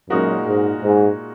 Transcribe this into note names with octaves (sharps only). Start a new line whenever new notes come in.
F#2 A#2 G#3 D#4 F#4 A#4
G#2
G#2